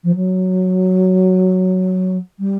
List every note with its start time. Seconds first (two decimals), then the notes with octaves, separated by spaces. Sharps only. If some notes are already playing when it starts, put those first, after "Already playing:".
0.04 F3
0.15 F#3
2.39 G3